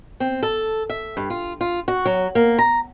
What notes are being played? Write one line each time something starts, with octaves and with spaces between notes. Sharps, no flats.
C4
A4
E5
G2
F4
F4
F#4
F#3
A#3
A#5